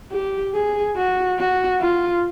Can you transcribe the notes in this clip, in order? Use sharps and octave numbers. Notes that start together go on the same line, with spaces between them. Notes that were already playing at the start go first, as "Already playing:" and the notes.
G4
G#4
F#4
F#4
F4